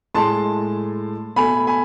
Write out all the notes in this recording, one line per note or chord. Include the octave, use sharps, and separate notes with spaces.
A2 G#3 A5 C6
B2 A3 G#5 B5
G#5 B5